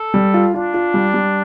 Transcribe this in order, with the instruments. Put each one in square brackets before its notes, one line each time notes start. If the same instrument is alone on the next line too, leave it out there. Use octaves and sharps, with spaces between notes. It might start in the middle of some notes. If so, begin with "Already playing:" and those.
Already playing: [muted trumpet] A4
[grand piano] G3
F4
[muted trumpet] D4 [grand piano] F4
[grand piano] F4
G3
G3